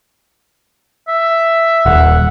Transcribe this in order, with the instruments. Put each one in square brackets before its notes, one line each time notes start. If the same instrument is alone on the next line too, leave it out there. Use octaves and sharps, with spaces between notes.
[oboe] E5
[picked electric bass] D#1 [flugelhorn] F#5